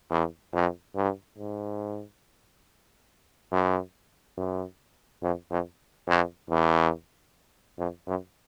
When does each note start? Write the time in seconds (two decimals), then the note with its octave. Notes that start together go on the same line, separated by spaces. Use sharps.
0.10 E2
0.53 F2
0.96 G2
1.38 G#2
3.52 F#2
4.37 F#2
5.23 F2
5.51 F2
6.08 F2
6.50 E2
7.78 F2
8.07 F#2